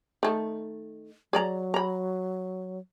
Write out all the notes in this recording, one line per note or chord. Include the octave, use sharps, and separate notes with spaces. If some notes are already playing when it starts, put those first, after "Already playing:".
D#3 A3
F#3 G#4 D5 A#5
A#5 B5